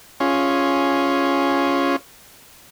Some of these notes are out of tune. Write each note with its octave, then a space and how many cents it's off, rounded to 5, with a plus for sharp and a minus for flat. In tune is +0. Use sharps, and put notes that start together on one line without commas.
C#4 +0 F4 +0 G#4 +0